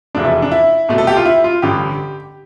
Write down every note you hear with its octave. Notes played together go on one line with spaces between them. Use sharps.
F1 E2 B2 A3 D4
E4
D4
E4
C2 B2 A3
A4
G4
F4
E4
F4
A1 G2 D3 G4